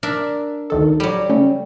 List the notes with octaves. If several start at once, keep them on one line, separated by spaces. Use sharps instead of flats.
D4 A#4 E5
D2 D#3 A4
F#3 G3
C#3 A3 C#4